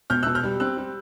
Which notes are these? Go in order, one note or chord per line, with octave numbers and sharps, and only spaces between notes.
B2 F6 G6
B2 E6 F#6
F6 G6
G3
C4 E6 F#6
G3